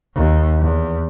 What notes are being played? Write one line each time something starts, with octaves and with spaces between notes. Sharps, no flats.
D#2
E2